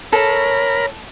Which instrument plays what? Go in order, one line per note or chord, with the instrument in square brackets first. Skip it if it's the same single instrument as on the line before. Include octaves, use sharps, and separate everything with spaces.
[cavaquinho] A4 [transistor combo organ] A#4 A#5 B5 [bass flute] C#5